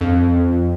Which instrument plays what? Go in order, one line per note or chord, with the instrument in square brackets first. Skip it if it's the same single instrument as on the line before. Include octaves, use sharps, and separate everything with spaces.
[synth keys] F2